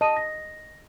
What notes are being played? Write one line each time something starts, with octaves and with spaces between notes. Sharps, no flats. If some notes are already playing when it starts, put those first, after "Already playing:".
D#5 A5 D#7
A#6